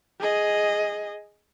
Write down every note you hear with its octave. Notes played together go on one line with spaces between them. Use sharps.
G#4 D#5